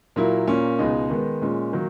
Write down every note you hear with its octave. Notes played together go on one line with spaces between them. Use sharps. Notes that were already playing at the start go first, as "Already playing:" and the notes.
A#2 F#3 A#3 E4
A#2 A#3 C#4
C#2 B2 G#3 D#4
D#3 G#3 B3
A#2 G#3 C#4
D#3 F#3 A#3